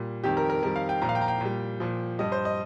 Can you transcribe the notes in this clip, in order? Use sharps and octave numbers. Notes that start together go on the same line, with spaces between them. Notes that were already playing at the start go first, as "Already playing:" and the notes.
Already playing: A#2 G3
F2 D#3 G3 G4
A#4
A#4
F2 D#3 G3 A#4
F5
G5
A#2 F3 A#5
F5
G5
A#5
G5
A#2 G3
A#2 F3
G2 G3 D#5
C5
D#5